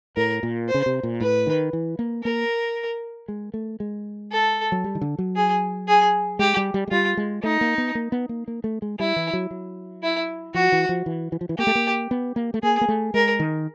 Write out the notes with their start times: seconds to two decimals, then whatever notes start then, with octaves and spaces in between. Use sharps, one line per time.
0.17 A2 A#4
0.43 A#2
0.68 C5
0.74 C#3
0.86 C3
1.03 A#2
1.20 A2 B4
1.47 D#3
1.73 E3
1.99 A#3
2.24 A#3 A#4
3.28 G#3
3.54 A3
3.80 G#3
4.32 A4
4.72 F#3
4.84 G3
4.95 D#3
5.01 D3
5.19 F#3
5.36 G#4
5.88 G#4
6.39 G#3 G4
6.57 G3
6.74 G3
6.88 G#3
6.91 G3 F4
7.17 G#3
7.43 A3 D#4
7.61 A#3
7.78 B3
7.95 A#3
8.12 B3
8.29 A#3
8.48 A#3
8.64 A3
8.82 G#3
8.99 G3 E4
9.16 E3
9.33 F#3
9.51 F#3
10.03 E4
10.54 F3 F#4
10.72 E3
10.89 F3
11.06 E3
11.32 E3
11.41 F3
11.49 E3
11.58 A#3 G4
11.67 A3
11.75 A#3
12.11 B3
12.36 A#3
12.54 A3
12.63 A#3 G#4
12.81 A#3
12.88 A3
13.14 G#3 A#4
13.40 D#3